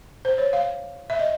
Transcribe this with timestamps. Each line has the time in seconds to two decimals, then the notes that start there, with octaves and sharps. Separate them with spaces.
0.25 C5
0.38 C#5
0.53 F5
1.10 E5
1.19 D#5